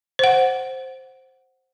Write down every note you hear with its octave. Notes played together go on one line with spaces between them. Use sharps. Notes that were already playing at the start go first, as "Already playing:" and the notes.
C5 F#5